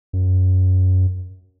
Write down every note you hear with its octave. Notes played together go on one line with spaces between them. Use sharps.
F#2